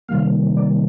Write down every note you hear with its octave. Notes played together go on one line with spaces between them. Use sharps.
C3 D#3 G3 A#3 F5
D5